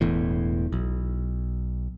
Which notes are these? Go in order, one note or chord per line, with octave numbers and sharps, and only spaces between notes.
E1 E2 A2
B1